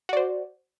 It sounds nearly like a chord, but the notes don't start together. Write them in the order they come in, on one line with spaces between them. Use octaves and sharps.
F#4 D5 C5